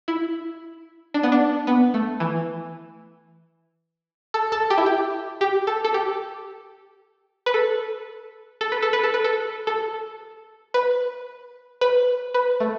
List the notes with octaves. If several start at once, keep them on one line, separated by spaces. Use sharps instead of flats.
E4
D4
B3
D4
B3
A3
E3
A4
A4
G4
E4
G4
G4
A4
A4
G4
B4
A4
A4
B4
A4
B4
A4
B4
A4
A4
B4
B4
B4
A3